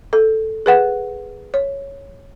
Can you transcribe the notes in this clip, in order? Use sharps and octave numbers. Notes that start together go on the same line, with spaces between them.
A4
G#4 B4 F#5
C#5